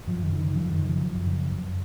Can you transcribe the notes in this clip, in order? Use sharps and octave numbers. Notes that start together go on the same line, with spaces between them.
F#2 F3
D#3
C#3
D#3
F#2 F3
D#3
C#3
F3
F#2
C#3
F#2